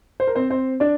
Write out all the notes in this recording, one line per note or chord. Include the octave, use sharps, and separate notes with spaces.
C5
A#4
C4 C5
C4 C5
D4 D5